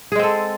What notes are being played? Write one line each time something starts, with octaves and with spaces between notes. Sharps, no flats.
G#3 C4 G#4 A4